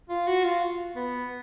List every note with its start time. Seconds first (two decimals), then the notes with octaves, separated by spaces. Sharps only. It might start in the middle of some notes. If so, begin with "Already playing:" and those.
0.09 F4
0.27 F#4
0.44 F4
0.96 B3